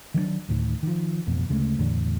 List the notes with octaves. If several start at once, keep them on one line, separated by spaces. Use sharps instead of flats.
D#3 F#3 A#3 D4
D2 A2 D#3
D#3 F3
A1 F2 B2
D2 C#3 G#3 A3
E2 A2 D3